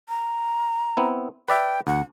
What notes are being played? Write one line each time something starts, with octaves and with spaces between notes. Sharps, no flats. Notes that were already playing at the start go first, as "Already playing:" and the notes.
A#5
B3 C4 E4
B4 D5 E5 G5
D2 F#5